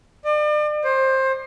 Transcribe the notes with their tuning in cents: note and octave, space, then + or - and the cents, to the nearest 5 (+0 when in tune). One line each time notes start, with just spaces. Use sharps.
D5 +40
C5 +20